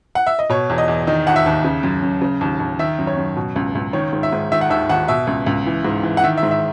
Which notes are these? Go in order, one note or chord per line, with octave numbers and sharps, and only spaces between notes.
F#5
E5
D#5
B2 C#5
E2
D#5
E2
D#3 D#5
D#2 F#5
E5
D#2
C#3
F#2
F#2
C#3
D#2
D#2
D#3 E5
F#2
C#5
F#2
B2
C#2
C#2
D#3 C#5
G#2
E5
G#2
D#3 E5
F#5
D#2 E5
D#2 F#5
B2 E5
C#2
C#2
E3
G#2
E3
F#5
D#3 E5
E5
G#2
E5